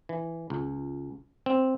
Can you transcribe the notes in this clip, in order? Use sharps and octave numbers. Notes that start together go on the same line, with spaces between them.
E3
C#2
C4